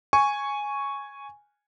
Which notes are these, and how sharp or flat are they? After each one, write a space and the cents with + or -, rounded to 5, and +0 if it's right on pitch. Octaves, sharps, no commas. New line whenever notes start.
G#5 +0 C#6 +0